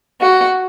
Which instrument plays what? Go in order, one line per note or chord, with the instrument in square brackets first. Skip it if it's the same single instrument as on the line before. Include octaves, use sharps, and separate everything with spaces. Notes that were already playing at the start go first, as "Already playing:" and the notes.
[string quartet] F#4